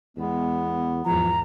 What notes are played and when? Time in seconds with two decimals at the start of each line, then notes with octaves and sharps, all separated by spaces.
0.17 E2 G#3 B3
1.06 E2 G#2 F3 A#5